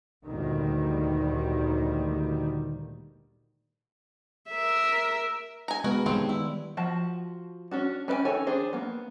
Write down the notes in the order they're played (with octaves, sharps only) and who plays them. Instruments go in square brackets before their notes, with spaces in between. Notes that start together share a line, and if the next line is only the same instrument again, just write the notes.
[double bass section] G1 D2 A#2 D#3 G3
[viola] A#4 E5
[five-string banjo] G#5 A#5
[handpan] G#3 B3 B4 [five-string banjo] F#4 A#4
[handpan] D#3 G3 [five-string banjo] F3 C4 C#5
[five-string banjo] E4
F3 F#4 A5
C#4 D4 F#4
C#4 B4 E5 G5 G#5
D#3 A4 C#5 G#5
D4 G#4 C5
A#3 B3